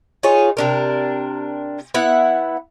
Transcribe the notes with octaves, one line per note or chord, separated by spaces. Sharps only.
D#4 F4 G#4 C#5
C3 D4 A#4
B3 E4 F#5